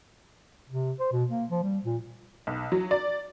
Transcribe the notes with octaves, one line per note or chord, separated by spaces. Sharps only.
C3
C5
B2
A#3
F3
G3
A#2
B1
F#3
D5